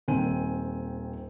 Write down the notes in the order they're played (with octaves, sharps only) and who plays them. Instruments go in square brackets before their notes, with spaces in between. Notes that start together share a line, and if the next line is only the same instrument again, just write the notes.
[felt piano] D#1 D#3 C4 G#5 D#7